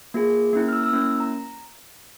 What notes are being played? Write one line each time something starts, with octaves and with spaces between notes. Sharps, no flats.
A#3 F4 G#4
A#3 C#4 E4
F6
E6
E6
A#3 C#4 E4
A#5